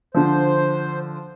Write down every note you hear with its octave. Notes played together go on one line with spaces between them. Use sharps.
D3 F3 C5